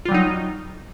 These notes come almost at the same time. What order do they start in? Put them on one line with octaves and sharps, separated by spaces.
F4 G3 F#3 D#4